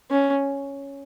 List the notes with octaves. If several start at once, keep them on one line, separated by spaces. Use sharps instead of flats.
C#4